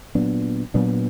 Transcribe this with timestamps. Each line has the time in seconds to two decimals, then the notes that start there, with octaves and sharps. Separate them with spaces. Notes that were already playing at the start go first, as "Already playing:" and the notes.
0.15 A#2 F#3 B3 D4
0.74 A#2 F#3 B3 D4